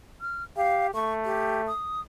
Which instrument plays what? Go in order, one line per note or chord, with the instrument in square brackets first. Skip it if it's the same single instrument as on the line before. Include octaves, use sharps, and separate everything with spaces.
[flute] F6
[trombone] G4 [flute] F5
[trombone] A3 [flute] C#6
[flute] G4
D#6